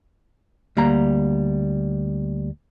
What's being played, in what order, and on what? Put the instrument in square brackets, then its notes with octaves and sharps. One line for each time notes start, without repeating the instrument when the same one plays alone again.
[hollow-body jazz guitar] D2 G3 A#3 A#5